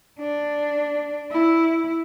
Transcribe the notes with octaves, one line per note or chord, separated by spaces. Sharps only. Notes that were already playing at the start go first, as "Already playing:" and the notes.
D4
E4